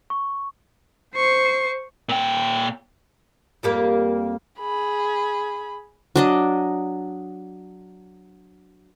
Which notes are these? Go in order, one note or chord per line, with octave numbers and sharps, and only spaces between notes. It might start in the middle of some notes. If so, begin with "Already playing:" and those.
C#6
C5 C#6 C7
A#2 G5
F2 G3 A#3
G#4 B5
F#3 D4 D#5